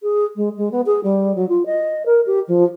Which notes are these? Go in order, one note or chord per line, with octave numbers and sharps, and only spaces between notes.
G#4
G#3
G#3
B3
G#4
G3
F#3
F4
D#5
A#4
G4
F3